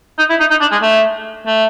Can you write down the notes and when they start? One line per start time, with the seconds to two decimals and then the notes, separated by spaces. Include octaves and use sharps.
0.19 D#4
0.30 E4
0.40 D#4
0.51 D#4
0.61 D4
0.72 G#3
0.82 A3
1.46 A3